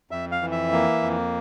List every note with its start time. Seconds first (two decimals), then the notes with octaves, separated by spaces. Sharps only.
0.11 F2 E5
0.32 F5
0.41 E3
0.52 E5
0.72 A#3
1.02 F2